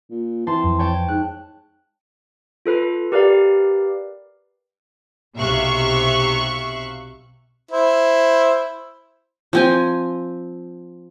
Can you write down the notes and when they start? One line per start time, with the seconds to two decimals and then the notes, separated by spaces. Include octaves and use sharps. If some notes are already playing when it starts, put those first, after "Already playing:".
0.11 A#2
0.47 E3 C4 A5 C6
0.64 F2
0.79 C#5 G5 A5
1.08 G#2 F#6
2.66 F4 A4 B4 B5
3.12 G4 A#4 B4 D5 F5
5.36 B1 C3 E5 F5 C#6 F#6
7.71 E4 C5
9.53 F3 C4 G#5